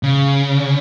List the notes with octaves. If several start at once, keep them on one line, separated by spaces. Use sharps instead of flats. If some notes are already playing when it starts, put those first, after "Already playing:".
C#3